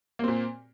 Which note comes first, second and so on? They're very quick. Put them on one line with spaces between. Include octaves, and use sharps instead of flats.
A#3 C4 A#2